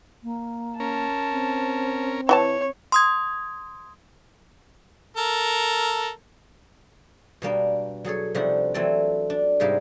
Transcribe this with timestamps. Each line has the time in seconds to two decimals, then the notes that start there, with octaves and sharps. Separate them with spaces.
0.23 A#3
0.80 C#4 A#4 A5
1.32 C4
2.29 E3 F#4 C#5 A5
2.92 C6 D#6 G#6
5.17 A4 A#4
7.42 B2 G3 A#3 D4
8.04 F#3 G#4 A4 C#5
8.35 C3 F3 G3 D4 D#4 F#4
8.74 E3 F#3 A3 C4 D4 D5
9.30 D4
9.60 G#2 C3 G3 A#3 G4 G#4